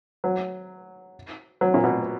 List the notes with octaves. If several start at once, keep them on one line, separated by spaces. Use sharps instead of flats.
F#3
F#3
A#2
B2